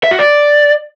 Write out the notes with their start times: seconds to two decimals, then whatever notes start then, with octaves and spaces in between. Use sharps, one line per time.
0.04 E5
0.11 F#4
0.19 D5